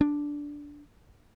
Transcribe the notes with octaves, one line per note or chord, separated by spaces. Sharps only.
D4